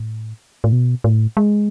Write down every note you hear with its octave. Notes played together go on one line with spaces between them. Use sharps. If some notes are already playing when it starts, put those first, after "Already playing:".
Already playing: A2
A2
B2
A2
G#3